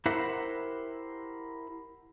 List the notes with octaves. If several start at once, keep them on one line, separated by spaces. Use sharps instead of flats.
E4 G4 A#4 C5 E5 F#5